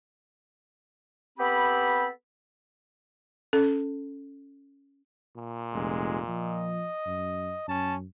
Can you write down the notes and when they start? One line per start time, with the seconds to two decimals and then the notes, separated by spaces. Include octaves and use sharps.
1.38 B3 C4 G4 A4 G5 B5
3.53 C#4 A4
5.36 A#2
5.74 F1 G#3
6.28 F3 D#5
7.06 F#2
7.68 F#2 C#4 A5